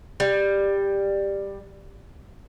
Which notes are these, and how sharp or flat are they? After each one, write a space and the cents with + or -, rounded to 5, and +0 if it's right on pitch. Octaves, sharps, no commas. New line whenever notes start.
G3 +10